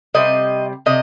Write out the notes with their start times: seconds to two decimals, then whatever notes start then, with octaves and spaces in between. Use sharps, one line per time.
0.14 C3 G3 C4 D#5
0.86 C3 D#5